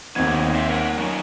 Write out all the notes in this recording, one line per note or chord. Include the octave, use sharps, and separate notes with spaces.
D#2 D#3 B3 C4 G#6
C5 E5
A#4 F#5
F#3 C#4 D#4